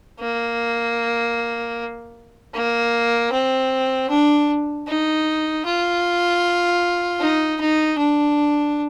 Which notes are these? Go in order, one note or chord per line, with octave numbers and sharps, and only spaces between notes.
A#3
A#3
C4
D4
D#4
F4
D#4
D#4
D4